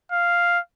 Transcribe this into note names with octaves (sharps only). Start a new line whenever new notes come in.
F5